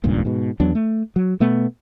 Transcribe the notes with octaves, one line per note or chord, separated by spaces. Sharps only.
D#1 C#2 G2 A#2
G#2 B2
E2 F#3 B3 D4
A3
F#3
B2 A3 B3